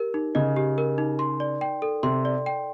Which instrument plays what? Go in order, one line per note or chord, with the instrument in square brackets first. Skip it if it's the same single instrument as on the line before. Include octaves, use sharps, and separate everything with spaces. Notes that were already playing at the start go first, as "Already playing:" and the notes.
Already playing: [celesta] G4 A#4
D#4
[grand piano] C#3 [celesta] D#5
[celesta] G4
A#4
D#4
C6
D5
G5
A4
[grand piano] C3 [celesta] C6
[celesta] D5
G5